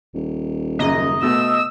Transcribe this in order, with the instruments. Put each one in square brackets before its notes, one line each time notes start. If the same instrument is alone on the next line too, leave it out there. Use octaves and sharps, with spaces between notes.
[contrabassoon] D#1
[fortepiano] F#2 C#3 A#3 [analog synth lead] D#5
[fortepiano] B2 A3 B3 [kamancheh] E6